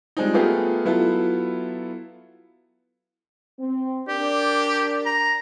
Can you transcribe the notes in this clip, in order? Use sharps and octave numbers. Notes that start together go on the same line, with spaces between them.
F3 G3 G#3 C4 D#4
A3 B3 F4 G4 G#4 A#4
F#3 B3 E4 F4 A4
C4
D4 G4 A#4 D5
A#5